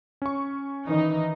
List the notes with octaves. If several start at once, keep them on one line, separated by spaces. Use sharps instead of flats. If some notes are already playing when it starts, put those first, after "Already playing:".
C#4 C#6
D#3 E3 D#4